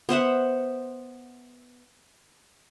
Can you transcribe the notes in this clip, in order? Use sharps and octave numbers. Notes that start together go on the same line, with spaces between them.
B3 C5 E5 F#5